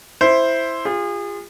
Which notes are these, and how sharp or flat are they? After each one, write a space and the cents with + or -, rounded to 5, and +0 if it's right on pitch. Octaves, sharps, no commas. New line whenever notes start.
E4 +0 C5 +0
F4 +0 G#4 -35